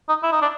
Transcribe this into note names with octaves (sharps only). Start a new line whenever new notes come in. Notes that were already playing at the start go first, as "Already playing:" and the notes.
D#4
E4
D#4
D4